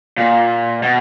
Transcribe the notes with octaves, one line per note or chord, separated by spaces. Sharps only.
A#2
B2